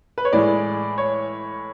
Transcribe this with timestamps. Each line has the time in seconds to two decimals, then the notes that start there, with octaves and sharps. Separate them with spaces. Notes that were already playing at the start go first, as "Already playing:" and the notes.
0.18 B4
0.25 C#5
0.33 A2 E3 G#3 D5
0.98 C#5